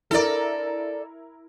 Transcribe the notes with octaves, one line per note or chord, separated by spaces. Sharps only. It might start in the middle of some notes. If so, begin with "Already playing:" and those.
E4 A4 A#4 D5